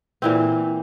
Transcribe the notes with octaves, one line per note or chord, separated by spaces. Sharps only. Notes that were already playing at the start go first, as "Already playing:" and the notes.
A#2 E3 C4